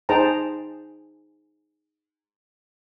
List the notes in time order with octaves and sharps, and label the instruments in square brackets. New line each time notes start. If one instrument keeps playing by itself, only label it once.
[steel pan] D#4 G#4 C5 G5 A5 A#5